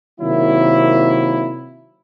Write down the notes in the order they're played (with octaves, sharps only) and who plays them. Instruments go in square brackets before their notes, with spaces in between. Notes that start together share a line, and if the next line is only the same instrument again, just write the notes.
[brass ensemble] C3 D#3 F#3 A#3 E4